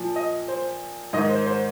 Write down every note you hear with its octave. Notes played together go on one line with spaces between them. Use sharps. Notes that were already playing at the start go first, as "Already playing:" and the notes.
Already playing: A#2 F3
D#5
C5
G#2 D#3 D#5
C5
C5